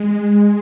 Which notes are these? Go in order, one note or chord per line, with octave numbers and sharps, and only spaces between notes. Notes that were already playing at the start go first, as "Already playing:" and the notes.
Already playing: G#3